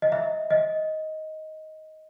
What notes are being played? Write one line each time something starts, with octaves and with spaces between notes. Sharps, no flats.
D#5
E5
D#5